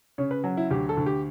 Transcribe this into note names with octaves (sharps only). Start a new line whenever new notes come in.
C#3 C#5
B4
F#3
E4
D2 G4
A4
D2
G4